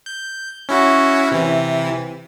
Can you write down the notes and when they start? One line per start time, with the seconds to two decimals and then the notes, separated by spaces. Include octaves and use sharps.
0.06 G6
0.69 C#4 E4 F#4
1.32 C3 E3